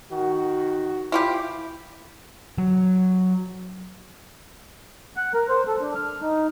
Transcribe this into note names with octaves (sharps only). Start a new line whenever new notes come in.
D#3 F#4
E4 F4 G4
F#3
F#5
A#4
C5
A4
D4
F6
D#4